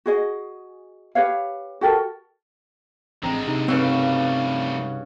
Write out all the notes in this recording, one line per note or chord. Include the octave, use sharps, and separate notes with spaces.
F#4 G#4 D#5
G4 B4 C#5 F5
F#4 G4 A4 A#4
A1 D3 G#3 C4 A#5
C3 D#4
G2 C#3 G3 A3 C4 F#4